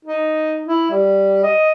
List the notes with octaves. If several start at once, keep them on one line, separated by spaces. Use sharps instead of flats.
D#4
E4
G3
D#5